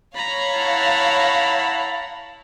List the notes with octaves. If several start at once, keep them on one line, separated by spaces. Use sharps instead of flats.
C#5 F5 A#5 B5
E4 F#5 A5